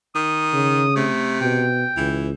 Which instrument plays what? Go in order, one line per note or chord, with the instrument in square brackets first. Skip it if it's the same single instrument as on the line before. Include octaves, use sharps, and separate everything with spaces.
[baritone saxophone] D#3 [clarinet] D#6
[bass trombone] C#3
[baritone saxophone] C3 [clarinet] A3
[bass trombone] B2 [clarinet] G5
[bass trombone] C#2 [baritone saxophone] E3